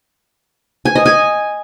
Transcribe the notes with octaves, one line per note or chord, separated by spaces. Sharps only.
G#5
D#5
G#5